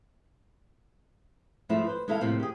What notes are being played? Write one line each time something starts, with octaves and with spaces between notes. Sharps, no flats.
G#2 F3 G#3 A3 E4
B4 C5
G#3 D#4 E4 A4 D#5 F5
A2 C3 F3 A#3
G4 G#4